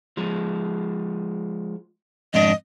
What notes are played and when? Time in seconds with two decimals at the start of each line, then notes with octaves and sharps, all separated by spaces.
0.17 F3 G#3
2.34 F2 G#2 D4 D#5